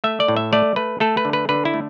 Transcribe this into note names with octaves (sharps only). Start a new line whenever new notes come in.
A3 E5
D5
A2
E5
A3 D5
A3 B4
A3 A4
B4
D3
B4
D3 B4
E4
A3